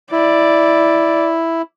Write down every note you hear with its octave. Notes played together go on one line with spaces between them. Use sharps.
E4 D5